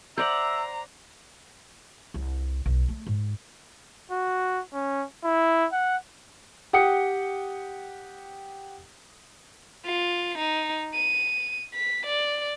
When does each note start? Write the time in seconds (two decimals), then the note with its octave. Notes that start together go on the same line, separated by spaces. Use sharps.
0.18 C5 D5 E5 F#5 A#5
2.14 C2
2.66 B1
2.89 A3
3.07 G#2
4.11 F#4
4.73 C#4
5.24 E4
5.73 F#5
6.73 G4 F#5 G5 D#6 C#7
9.86 F4
10.38 D#4
10.94 D#7
11.74 B6
12.06 D5